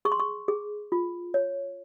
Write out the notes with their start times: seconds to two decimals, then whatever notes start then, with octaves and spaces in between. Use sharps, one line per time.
0.05 G#4 C#6
0.12 C6
0.20 C#6
0.48 G#4
0.92 F4
1.34 C#5